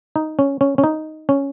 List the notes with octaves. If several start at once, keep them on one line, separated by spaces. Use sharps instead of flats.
D#4
C#4
C#4
C#4
D#4
C#4